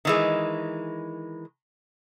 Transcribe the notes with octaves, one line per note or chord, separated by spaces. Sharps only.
D#3 E3 G#3